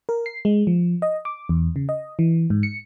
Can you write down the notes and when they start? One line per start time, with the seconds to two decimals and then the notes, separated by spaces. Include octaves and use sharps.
0.09 A#4
0.26 C7
0.45 G#3
0.67 F3
1.02 D#5
1.25 D6
1.49 E2
1.76 C#3
1.89 D#5
2.19 E3
2.50 G#2
2.63 C#7